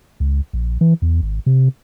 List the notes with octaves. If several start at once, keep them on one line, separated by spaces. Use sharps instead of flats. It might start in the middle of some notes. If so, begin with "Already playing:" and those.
C#2
A#1
E3
E2
G#1
C3